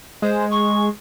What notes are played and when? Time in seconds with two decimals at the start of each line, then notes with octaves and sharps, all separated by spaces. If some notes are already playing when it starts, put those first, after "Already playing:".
0.22 G#3 C5
0.50 C#6